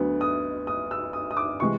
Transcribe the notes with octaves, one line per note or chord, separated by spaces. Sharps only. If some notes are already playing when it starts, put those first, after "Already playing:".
Already playing: D2 D3 F#3 B3
D#6
D#6
E6
D#6
D#6
D6
C3 E3 G#3 C#6